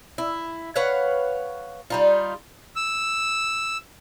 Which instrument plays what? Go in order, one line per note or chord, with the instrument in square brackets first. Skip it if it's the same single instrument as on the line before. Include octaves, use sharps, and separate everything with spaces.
[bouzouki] E4
B4 C#5 F5 F#5
G3 D#4 F4
[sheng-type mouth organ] E6